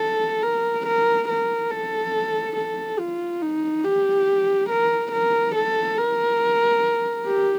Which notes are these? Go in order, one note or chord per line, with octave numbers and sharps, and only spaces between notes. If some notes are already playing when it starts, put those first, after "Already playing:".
Already playing: A4
A#4
A#4
A#4
A4
A4
F4
D#4
G4
A#4
A#4
A4
A#4
G4